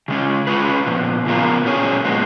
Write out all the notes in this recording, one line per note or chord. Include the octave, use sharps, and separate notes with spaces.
C#3 G#3 C#4
G#3 C#4 F4 B4
A#2 F3 B3
C#3 F3 B3 F4 A#4
A#2 F#3 C#4 G#4 C#5
A#2 G#3 B3